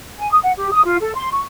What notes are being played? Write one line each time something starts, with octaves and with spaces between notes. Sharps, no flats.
G#5
D#6
F#5
G4
D#6
F4
A4
C6
C#6